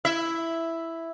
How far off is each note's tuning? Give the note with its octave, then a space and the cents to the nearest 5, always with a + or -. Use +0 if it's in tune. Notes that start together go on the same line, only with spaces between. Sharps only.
E4 +5 E5 +0